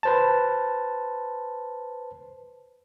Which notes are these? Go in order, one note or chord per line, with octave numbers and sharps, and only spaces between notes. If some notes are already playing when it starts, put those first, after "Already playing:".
B4 C5 A5